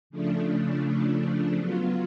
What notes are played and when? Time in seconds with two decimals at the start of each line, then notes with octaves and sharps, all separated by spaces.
0.10 C#3 F3 A3 D4
1.57 F#3 B3 F4